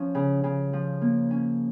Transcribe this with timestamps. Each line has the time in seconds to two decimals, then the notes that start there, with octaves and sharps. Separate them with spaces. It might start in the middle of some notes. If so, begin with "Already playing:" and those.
Already playing: F3 C#4
0.15 C#3
0.44 C#3
0.73 F3
1.02 A#3
1.31 C#4